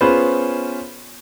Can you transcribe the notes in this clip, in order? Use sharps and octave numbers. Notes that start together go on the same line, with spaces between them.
B3 C#4 F4 G#4 B4 C5